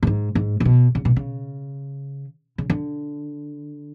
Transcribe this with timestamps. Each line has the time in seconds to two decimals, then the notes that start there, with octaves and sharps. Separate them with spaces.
0.03 A2
0.07 G#2
0.35 G#2
0.60 A2
0.65 B2
0.95 C#3
1.05 B2
1.16 C#3
2.58 C#3
2.70 D3